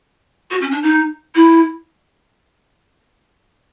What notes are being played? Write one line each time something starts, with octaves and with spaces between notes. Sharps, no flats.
F#4
C#4
D4
D#4
E4